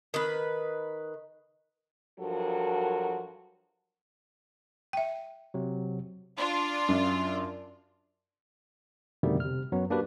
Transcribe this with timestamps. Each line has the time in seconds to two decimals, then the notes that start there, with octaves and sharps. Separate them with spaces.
0.14 D#3 B4
2.19 G2 F3 F#3 F#4 A4 A#4
4.93 E5 G5
5.54 C3 F#3
6.37 D4 F4
6.89 F#2
9.23 F2 B2 D3 D#3 G3 A3
9.40 C3 F6
9.72 F#2 F#3 B3
9.90 A#3 D4 F#4 G4 B4